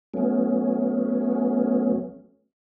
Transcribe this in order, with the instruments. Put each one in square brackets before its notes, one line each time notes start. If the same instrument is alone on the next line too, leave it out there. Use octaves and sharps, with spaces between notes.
[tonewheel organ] F#3 A3 B3 C#4